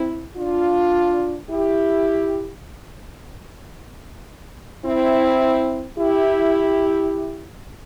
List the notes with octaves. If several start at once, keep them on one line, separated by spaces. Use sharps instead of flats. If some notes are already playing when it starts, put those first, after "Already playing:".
Already playing: C4 E4
D4 F4
E4 G4
C4 E4
E4 G4